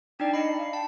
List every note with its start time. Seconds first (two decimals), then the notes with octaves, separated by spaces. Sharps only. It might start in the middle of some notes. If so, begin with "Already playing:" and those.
0.20 D4 D#4 D5 G5
0.34 D#5 B5 C7 C#7
0.58 F5
0.73 G5 A5